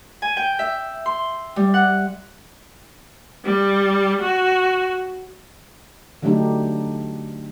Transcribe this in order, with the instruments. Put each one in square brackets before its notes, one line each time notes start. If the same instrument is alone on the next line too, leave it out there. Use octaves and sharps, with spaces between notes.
[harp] G#5
G5
E5
C6
G3
F#5
[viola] G3
F#4
[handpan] D3 F#3 A3 D4 D#4 G4